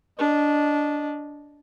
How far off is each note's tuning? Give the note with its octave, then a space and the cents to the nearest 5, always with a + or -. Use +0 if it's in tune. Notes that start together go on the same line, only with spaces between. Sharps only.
D4 -10 D#5 -20